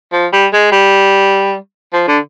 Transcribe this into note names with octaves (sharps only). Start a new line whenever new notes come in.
F3
G3
G#3
G3
F3
D3